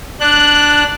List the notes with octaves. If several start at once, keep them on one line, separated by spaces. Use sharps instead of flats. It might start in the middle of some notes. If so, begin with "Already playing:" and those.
D4 F#6